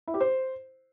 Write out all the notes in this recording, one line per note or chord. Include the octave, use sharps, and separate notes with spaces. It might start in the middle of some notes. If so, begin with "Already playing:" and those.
E4
G4
C5